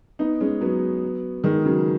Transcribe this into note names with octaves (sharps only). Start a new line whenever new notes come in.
B3 D#4
G#3 C#4
F#3 B3
D#3 G#3
C#3 F#3